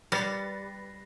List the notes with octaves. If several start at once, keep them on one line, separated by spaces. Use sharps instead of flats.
G3 B4 A6 A#6 C7 C#7